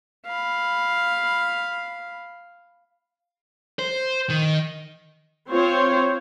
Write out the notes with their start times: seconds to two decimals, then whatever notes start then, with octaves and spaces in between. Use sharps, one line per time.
0.26 F5 B5
3.79 C5
4.30 D#3
5.49 C4 F4 C5 C#5